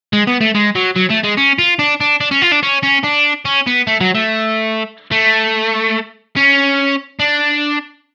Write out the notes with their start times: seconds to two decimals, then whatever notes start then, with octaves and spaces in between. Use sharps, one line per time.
0.13 G#3
0.27 B3
0.41 A3
0.55 G#3
0.75 F#3
0.96 F#3
1.10 A3
1.24 G#3
1.38 C#4
1.59 F4
1.79 D4
2.01 D4
2.21 D4
2.31 C#4
2.42 F4
2.52 D4
2.63 C#4
2.83 C#4
3.04 D4
3.45 C#4
3.67 B3
3.87 A3
4.01 F#3
4.15 A3
5.12 A3
6.37 C#4
7.19 D4